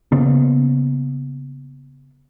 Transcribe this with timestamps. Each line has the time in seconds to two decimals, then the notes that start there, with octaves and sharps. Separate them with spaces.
0.12 C#3 A#3 B3